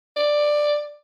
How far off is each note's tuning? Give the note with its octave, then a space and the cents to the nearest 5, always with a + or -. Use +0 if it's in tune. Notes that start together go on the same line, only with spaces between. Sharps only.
D5 +10